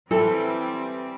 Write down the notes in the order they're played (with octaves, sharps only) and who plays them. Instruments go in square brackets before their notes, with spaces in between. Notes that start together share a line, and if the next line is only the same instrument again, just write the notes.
[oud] E3 [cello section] G3 C4 [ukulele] A4